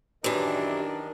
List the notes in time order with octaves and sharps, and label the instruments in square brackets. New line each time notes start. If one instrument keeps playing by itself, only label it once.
[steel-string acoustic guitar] F#2 E3 [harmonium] D#3 A#4 D#5 [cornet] D4 [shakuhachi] G4